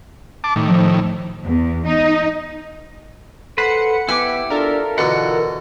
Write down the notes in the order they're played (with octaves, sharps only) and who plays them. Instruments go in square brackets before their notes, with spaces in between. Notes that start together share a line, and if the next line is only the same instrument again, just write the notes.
[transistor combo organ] A5 D6
A2 D#3
[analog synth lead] F3
[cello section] E2
D#4
[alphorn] A4 [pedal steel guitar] B4 C5 [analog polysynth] F#5 C#7
[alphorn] B3 [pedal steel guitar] E4 G4 D6 [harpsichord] G#5
[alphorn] D4 [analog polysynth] F4 A4 A#4
[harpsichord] B2 D3 [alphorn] E3 [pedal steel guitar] F#5